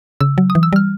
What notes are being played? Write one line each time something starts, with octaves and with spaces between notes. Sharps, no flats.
C#3 E6
F#3
D#6
E3
E6
G3 F6